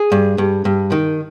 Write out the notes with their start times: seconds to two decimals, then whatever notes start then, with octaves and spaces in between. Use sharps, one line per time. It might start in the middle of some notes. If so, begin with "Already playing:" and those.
Already playing: G#4
0.12 G2
0.38 G2
0.65 G2
0.92 D#3